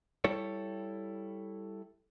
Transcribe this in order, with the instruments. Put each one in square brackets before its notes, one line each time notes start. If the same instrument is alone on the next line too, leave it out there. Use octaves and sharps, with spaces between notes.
[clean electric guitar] G3 E4 A4 C#5